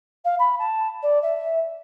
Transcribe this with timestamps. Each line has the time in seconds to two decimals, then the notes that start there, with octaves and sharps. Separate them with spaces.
0.25 F5
0.39 B5
0.59 A5
1.02 D5
1.22 E5